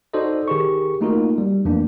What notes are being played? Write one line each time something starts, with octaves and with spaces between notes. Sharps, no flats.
D#4 F#4 A4 C5 D5 D#5
D#3 G4 G#4 A#4 C#6
A3 A#3 D#4 F4 F#4 A#4
G3
F2 E3 A3 A#3 D4